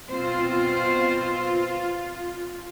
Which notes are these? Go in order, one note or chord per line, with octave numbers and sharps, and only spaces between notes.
B2 C4 F4 C5